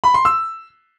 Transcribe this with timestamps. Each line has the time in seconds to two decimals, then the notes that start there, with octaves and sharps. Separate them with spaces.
0.04 B5
0.14 C6
0.25 E6